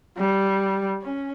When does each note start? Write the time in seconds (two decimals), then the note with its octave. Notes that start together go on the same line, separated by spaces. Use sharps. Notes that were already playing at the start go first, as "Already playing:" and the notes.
0.18 G3
1.03 C#4